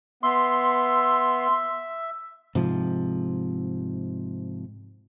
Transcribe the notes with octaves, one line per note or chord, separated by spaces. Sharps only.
B3 E5 C6
G#2 C3 F3